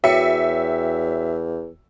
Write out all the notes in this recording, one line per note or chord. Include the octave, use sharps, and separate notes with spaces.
E2 F#4 C#5 E5 G5 C#7